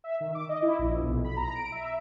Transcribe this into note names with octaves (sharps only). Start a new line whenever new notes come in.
E5
D#3
D6
D#5
E4
A#1
B1
B5
A#5
D7
E5